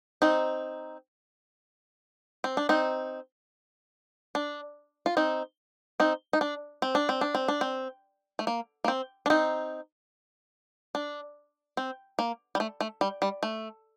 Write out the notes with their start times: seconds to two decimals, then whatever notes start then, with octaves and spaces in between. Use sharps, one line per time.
0.22 C4 D#4
2.44 C4
2.57 D4
2.69 C4 D#4
4.35 D4
5.06 F4
5.17 C4 D#4
6.00 C4 D#4
6.33 D#4
6.41 D4
6.82 C4
6.95 D4
7.09 C4
7.21 D4
7.35 C4
7.48 D4
7.61 C4
8.39 A3
8.47 A#3
8.84 A#3
8.88 C4
9.26 D4
9.30 C4 D#4
10.95 D4
11.77 C4
12.19 A#3
12.55 G3
12.60 A3
12.81 A3
13.01 G3
13.22 G3
13.43 A3